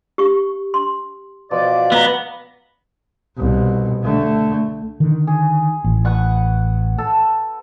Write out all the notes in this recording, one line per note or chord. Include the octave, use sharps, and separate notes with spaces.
G4 C#6
C6
B2 F3 D5
B3 F5 A#5
C2 B2
D3 A3
D3 D#3
G#4
A1
B4 F#5 C#6
A4